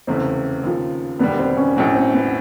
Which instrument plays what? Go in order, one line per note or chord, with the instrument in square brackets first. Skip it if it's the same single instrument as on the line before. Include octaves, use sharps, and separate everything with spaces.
[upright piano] F1 E2 C#3 E3 A3 [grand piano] C4
[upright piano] D#2 C#3 F3
[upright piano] E1 D#2 D3 G3 [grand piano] B3
[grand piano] C4
C#4
[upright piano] A#1 A2 F#3 [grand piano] C#4
[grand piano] C4
B3